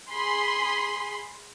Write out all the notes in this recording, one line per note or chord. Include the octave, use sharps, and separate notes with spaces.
G#4 B5 C6